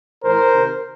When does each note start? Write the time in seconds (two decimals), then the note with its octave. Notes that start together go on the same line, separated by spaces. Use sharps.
0.23 A2 E3 A#4 C5
0.52 C3 D#3